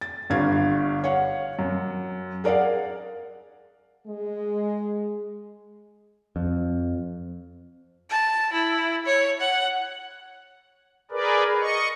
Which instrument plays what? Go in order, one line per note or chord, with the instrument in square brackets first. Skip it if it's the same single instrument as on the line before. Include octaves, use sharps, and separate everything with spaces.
[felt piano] A6
G1 G2 D3 F5 G#6
C#5 F5 F#5
F#2
G#4 A#4 D5 F5 F#5
[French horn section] G#3
[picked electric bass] F2
[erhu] A5
E4
C#5
F#5
[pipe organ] G#4 A#4 B4 D5
D#5 C#6